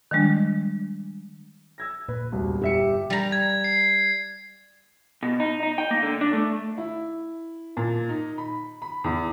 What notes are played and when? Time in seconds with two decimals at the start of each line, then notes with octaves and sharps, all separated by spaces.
0.11 D#3 F3 G3 G#3 D4
1.78 E6 G#6 A#6
2.09 A#2 B4
2.32 E1 C2
2.62 G1 G4 E5 C#7
3.10 G3 A#5
3.32 G#6
3.64 C7
5.23 B2
5.40 D#4
5.63 D#4
5.78 G5
5.91 A#3
6.02 D3
6.21 D4
6.33 A3
6.78 E4
7.77 A#2
8.09 D#4
8.38 B5
8.82 B5
9.04 E2